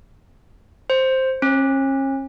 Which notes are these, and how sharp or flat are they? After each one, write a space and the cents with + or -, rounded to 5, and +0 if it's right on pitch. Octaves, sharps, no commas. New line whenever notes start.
C5 +5
C#4 -40